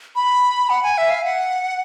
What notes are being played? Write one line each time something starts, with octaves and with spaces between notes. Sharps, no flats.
B5
F#5
G#5
E5
F5
F#5